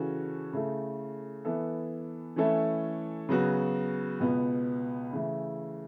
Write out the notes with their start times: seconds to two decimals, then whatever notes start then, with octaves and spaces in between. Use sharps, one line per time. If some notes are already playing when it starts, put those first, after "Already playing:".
Already playing: C#3 E3 C#4 F#4 A4
0.53 C#3 A3 E4 A4
1.45 E3 B3 E4 A4
2.36 E3 A3 C#4 E4 A4
3.29 C#3 F#3 B3 F#4
4.20 C#2 B2 B3
5.13 C#3 E3 A3 E4